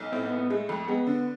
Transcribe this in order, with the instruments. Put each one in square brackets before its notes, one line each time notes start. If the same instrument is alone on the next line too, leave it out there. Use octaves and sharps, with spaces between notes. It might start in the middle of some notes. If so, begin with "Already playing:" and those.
Already playing: [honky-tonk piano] B1
[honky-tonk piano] A2 [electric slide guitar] C4
[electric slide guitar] B3
[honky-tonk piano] A2
[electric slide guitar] B3
[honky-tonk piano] G#3 [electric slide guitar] A3
[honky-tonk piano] F2 [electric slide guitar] A3
[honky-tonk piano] G#3 [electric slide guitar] B3
[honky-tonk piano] D3